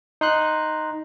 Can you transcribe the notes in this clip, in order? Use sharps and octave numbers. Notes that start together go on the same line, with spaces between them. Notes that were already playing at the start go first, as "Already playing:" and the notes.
D#4 C6 F#6